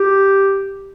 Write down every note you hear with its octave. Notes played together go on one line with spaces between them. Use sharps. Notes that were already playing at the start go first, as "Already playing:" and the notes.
Already playing: G4